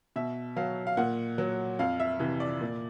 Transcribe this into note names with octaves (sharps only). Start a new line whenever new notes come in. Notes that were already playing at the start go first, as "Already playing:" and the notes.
B2 E5
F#3 F5
F5
A#2 F#5
F#3
F2 F5
E5
C3 E3
D5
A#2